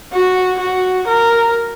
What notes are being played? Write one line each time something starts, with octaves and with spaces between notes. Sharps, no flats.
F#4
F#4
A#4